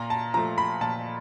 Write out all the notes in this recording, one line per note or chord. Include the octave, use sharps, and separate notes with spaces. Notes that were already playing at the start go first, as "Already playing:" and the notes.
Already playing: A#2 A#5
A5
F3 A3 A#5
B5
A#2 A5